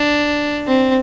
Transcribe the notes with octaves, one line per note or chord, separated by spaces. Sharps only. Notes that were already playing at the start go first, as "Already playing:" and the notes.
Already playing: D4
C4